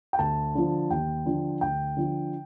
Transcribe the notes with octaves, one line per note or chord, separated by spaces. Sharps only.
G5
D2 A5
D3 F3
D#2 G5
D3 F3
D2 G5
D3 F3